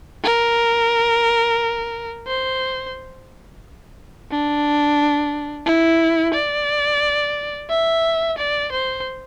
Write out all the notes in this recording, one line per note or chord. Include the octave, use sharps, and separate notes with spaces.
A#4
C5
D4
E4
D5
E5
D5
C5